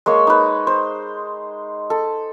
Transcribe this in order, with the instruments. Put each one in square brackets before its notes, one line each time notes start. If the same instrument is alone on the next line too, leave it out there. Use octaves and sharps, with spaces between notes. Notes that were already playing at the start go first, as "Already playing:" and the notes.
[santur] G#3 A#3 C#5
D#4 B4
C5
A4